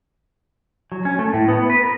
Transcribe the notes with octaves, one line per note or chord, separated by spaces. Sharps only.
F#3
C#4
A3
A2
B3
B4
A#4